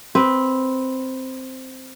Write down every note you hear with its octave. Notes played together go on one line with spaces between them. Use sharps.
C4 B4